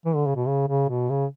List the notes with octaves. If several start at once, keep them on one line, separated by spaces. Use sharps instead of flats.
E3
D3
C#3
B2
C#3
C#3
B2
C#3